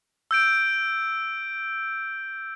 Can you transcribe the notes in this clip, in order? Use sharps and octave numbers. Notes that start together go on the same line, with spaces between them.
E6 G6 D7